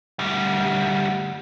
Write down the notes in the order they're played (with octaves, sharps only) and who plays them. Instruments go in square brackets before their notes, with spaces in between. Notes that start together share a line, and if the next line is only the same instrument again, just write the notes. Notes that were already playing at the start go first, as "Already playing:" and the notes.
[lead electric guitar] D2 G3